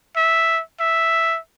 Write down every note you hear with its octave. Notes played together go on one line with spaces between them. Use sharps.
E5
E5